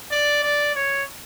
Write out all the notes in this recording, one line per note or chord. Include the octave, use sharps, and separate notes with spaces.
D5
D5
C#5